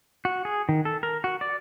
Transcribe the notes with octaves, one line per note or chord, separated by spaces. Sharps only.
F#4
G#4
D#3
A4
A#4
F#4
D5